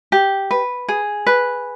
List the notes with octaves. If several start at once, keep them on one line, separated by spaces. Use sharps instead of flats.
G4
B4
G#4
B4